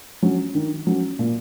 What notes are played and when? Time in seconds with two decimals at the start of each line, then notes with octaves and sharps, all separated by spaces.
0.22 F#3 C#4
0.55 D#3
0.87 F#3 C#4
1.19 A#2